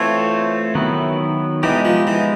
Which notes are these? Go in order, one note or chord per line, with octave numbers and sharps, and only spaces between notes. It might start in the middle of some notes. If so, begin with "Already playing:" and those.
Already playing: E3 A3 C4 F4 A4 C#5
D#3 F#3 B3 E4
E3 G#3 B3 D#4 G4
F3
E3